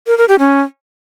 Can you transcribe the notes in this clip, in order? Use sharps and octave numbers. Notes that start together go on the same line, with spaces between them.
A#4
A#4
G4
C#4